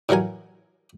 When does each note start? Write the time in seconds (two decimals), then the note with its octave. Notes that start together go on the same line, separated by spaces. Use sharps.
0.09 A2 E3 F#3 A#4 G#5